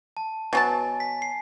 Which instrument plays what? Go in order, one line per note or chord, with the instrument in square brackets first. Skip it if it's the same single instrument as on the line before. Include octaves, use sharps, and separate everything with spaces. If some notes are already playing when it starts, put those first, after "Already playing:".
[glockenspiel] A5
[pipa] B2 F#3 A5 [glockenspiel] G#5
[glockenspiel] B6
C7